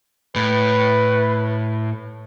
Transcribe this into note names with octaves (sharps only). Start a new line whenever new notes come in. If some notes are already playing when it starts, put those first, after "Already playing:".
A2 B4